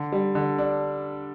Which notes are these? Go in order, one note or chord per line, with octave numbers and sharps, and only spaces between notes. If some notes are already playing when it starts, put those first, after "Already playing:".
Already playing: D3
G3
D3
D4